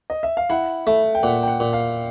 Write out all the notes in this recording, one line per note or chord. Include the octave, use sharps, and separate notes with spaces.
D#5
E5
F5
E4 F#5
A3 E5
G5
A#2 F#5
G5
F#5
A#2
F5